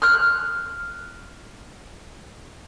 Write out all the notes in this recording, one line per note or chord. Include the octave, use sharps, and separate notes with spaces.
F6 F#6